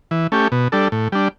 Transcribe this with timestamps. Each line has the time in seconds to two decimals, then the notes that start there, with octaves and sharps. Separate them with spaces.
0.11 E3
0.32 A3 C#4 G4
0.52 B2
0.72 G3 D4 A4
0.92 A2
1.12 G3 D4